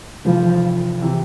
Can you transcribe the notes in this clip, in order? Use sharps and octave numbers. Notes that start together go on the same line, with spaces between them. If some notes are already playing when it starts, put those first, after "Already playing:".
F1 F2 E3 F3
C3 E3